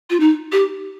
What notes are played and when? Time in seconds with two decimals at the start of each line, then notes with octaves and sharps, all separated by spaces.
0.10 F4
0.20 D#4
0.52 G4